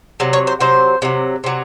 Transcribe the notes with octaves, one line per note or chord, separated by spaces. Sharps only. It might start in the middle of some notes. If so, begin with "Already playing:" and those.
C3 F#3
C#5
C5
C3 F#3 C5
C3 F#3
C3 F#3